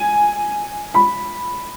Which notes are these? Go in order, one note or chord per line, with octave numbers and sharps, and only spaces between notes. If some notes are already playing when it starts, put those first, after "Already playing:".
Already playing: G#5
B5